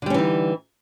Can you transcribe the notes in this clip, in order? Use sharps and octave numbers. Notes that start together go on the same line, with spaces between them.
D3 E3 G3 C#4 D#4